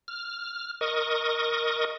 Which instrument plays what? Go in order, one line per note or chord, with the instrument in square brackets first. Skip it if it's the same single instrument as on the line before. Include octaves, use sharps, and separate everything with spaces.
[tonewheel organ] F6
A#4 D#5 C#6 D#6